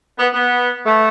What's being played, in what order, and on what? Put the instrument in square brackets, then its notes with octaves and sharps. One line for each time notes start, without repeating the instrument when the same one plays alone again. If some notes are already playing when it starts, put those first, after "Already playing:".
[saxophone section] B3
B3
A3